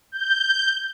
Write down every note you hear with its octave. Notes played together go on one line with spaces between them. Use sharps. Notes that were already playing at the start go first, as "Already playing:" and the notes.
G6